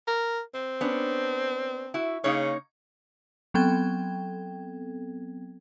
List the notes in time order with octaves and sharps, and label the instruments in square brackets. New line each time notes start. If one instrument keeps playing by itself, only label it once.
[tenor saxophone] A#4
C4
[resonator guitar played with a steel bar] B3 C#4 D4
E4 F#4
[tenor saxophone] C#3 [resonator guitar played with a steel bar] A#3 D#4 C#5
[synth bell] F#3 B3 C4 A4 G5 G#6